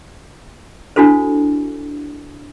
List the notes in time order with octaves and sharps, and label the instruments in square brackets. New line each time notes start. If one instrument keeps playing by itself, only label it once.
[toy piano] D4 E4 F#4 A4 C5